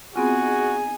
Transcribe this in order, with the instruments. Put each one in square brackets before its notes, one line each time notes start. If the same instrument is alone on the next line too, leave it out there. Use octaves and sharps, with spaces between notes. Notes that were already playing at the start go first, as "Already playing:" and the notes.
[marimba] B3 C4 F4 [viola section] D#4 G#4 [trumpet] F#4 [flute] G#5